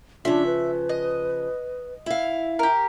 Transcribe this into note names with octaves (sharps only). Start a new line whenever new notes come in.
C#3 F3 D4 E5
B4
D#5
E4 E5 F5
G4 A#4